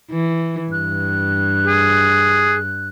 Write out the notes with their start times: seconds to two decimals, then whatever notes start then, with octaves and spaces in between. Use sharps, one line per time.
0.11 E3
0.72 G2 F#6
1.67 G#4